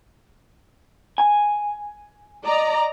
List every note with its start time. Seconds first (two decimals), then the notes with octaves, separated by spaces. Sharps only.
1.18 G#5
2.43 D5 D#5 A#5